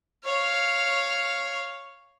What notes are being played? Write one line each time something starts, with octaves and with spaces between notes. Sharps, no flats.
C#5 F5